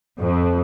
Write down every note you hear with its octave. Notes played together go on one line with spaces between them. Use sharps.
F2